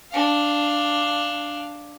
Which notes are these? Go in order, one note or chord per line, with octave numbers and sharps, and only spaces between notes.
D4 F5